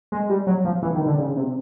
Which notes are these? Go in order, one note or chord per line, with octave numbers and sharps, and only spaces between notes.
G#3
G3
F#3
F3
E3
D#3
D3
C#3
C3